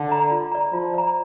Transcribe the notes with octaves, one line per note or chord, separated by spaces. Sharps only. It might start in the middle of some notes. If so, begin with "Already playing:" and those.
Already playing: D3
D5 A#5
F4
D5 A#5
F3 F4
D5 A#5